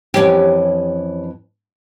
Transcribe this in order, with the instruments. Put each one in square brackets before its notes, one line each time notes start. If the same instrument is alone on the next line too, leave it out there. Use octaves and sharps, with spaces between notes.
[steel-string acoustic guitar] F2 E3 [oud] C#4 G4